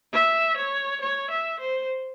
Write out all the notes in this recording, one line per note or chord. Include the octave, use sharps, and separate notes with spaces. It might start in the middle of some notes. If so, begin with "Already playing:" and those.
E5
C#5
C#5
E5
C5